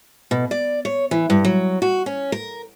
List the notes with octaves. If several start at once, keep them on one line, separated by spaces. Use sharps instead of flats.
B2
D5
C#5
E3
G2
F#3
F#4
C#4
A#4